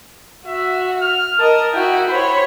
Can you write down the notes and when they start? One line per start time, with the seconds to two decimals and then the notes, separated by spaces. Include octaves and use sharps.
0.46 F#4 E5
1.01 F6
1.39 A#4 D#5 A5
1.73 E4 F#4 G5
2.09 C5 C#5 B5